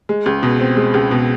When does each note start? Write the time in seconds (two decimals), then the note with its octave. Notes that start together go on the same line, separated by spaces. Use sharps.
0.09 G#3
0.26 C#2
0.43 B2
0.60 C4
0.77 G#3
0.94 C#2
1.11 B2